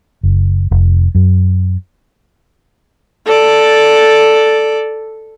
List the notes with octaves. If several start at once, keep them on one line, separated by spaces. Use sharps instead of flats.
F#1
F1
F#2
A4 D5